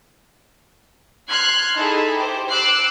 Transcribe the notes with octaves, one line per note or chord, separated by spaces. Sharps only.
C6 F6 F#6 G#6 C7
D#4 E4 G#4 A4
G4 C5
D6 E6 F#6 C7